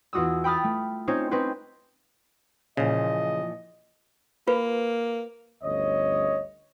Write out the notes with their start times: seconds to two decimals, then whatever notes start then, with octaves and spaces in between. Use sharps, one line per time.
0.13 E2 F4 F#4 D#6 E6
0.44 G5 B5 D#6 F6 A6
0.64 A3
1.07 C4 C#4 D#4 F4 C5 C#5
1.31 C4 C#4 D#4 B4 C5
2.77 A#2 C#3 E3 F3 D#5
4.47 A#3 F4 B4
5.63 G1 D2 C#4 C#5 D#5